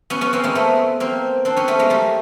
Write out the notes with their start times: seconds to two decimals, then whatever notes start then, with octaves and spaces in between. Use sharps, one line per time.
0.10 B3 C#4
0.21 B3 C#4
0.33 A#3 C4
0.43 G#3 A#3
0.55 A3 B3
1.00 A#3 C4
1.45 C4 D4
1.56 B3 C#4
1.68 A3 B3
1.79 G#3 A#3
1.90 G3 A3